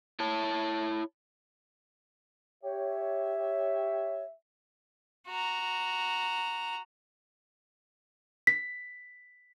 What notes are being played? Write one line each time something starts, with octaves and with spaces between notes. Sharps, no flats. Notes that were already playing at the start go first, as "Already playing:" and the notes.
E4 C#5 A5
G4 C#5 E5
F#4 A#5
B6